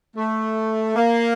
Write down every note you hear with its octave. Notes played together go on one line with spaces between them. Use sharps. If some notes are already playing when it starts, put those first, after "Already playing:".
A3
A#3